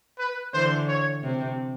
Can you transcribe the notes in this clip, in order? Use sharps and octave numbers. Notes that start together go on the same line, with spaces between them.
B4
D3 E3 C5
C#5
C3